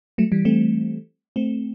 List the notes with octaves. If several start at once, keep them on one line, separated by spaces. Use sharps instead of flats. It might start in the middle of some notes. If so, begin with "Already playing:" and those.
F#3 A3
E3 G3
A3 C4
A3 C4